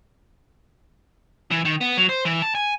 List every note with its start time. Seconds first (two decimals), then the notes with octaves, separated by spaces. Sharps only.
1.51 E3
1.65 D#3
1.81 B3
1.97 F#3
2.09 C5
2.25 E3
2.42 A5
2.55 G#5